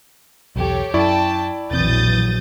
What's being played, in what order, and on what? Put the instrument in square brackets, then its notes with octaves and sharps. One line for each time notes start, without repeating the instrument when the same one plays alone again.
[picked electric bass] B1 E2 [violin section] G4 A4 C#5
[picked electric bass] F#2 [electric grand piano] E4 D5 C#6 [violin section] G5 A5
[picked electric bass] E1 C4 [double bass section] A#1 E3 F#3 [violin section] D#6 G6 A6